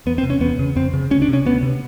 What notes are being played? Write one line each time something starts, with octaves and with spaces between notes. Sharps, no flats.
E2 B3
C4
C3
C#4
E2 B3
C#3
F2 C4
C#3
D2 C#4
D4
C3 C#4
D2 B3
C3